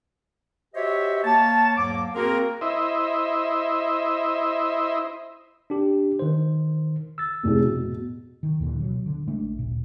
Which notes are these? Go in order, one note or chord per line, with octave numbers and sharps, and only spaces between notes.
F#4 G4 C5 C#5 D#5 E5
A#3 C#5 A5
E2 G#2 F#3 A#3 D6
A#3 C4 F#4 G#4 A#4
E4 C5 D#5 E5
D4 G4
D#3 C5
E6 A6
F1 A2 G#4
B2
D#3
D#2 A#2 D3 E3
B2 F#3
D3
A1 G#3 A3 D4
D1 A#2